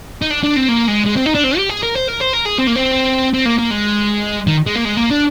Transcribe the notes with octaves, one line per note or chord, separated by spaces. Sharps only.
D#4
D4
D4
C4
A#3
G#3
G#3
C4
D#4
D4
C4
G4
G#4
A#4
C5
A#4
C5
A#4
G#4
C4
A#3
C4
C4
A#3
A#3
G#3
D#3
G#3
A#3
G#3
A#3
D4